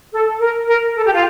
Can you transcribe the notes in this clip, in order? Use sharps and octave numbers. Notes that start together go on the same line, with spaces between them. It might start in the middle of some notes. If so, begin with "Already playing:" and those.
A4
A#4
A#4
A4
G4
F4